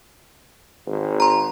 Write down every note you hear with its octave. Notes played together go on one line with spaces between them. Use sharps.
G#1
A#5 C6